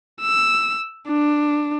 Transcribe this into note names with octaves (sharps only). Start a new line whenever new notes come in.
E6
D4